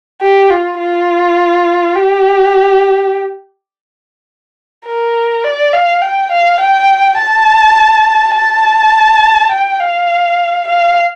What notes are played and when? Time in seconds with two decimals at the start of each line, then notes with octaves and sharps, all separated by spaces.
0.21 G4
0.50 F4
0.79 F4
1.96 G4
4.86 A#4
5.44 D5
5.73 F5
6.02 G5
6.32 F5
6.61 G5
7.19 A5
8.35 A5
9.51 G5
9.80 F5
10.68 F5